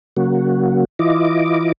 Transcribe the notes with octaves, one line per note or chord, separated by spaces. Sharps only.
C#3 F#3 A#3 F#4
E3 E4 F4 D#5 D6